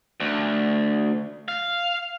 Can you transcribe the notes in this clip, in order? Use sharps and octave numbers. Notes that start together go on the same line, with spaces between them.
D2
F5